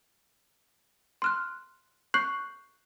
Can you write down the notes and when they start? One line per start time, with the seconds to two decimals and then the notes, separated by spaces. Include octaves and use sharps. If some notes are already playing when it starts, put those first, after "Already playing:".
1.22 C6 F6 F#6
2.14 C#6 F#6 G6 C7 F#7